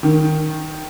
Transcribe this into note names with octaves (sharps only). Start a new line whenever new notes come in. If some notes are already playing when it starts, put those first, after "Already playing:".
D#3